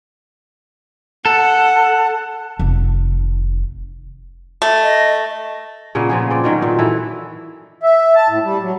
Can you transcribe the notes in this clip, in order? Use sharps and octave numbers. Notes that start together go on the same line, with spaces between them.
A4 F#5
F1 D#3
A3
D#5
A#2 C#3 A#3 B3
C#3 F3 G#4
C4 D5
B2 D#3 F#3
A#2
E3 E4 A4
E5
A5
A2
G3
F#3